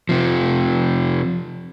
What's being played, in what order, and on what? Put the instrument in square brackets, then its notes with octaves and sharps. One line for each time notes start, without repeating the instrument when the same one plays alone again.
[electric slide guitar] C3 F3